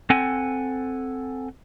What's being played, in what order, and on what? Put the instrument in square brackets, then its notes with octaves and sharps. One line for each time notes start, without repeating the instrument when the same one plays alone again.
[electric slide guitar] C4 A4 F#5 G#5